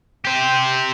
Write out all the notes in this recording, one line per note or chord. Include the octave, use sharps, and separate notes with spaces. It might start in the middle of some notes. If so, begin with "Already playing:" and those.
G4 C5